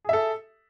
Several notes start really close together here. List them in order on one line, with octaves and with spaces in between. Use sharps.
G#4 E5 A4